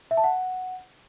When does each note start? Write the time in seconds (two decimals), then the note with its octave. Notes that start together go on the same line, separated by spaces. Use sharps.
0.11 E5
0.17 A5
0.24 F#5